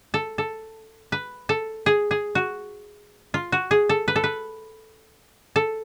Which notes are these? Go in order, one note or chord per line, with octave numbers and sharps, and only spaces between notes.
A4
A4
B4
A4
G#4
G#4
F#4
F4
F#4
G#4
A4
B4
A4
B4
A4